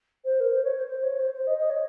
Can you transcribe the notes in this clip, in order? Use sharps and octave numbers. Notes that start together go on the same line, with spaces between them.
C5
A#4
C5
C#5
C5
C5
C#5
C5
C5
D#5
D#5
C#5